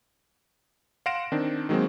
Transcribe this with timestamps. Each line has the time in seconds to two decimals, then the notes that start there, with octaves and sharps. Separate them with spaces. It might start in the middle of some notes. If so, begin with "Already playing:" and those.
1.06 F5 F#5 C6 A#6 D7 E7
1.32 D#3 C4 D4
1.69 D#3 F#3 G#3 A#3 C4